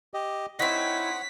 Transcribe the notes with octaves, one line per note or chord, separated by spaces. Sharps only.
G4 D#5
C4 D#4 E4 C#5 F#5 B6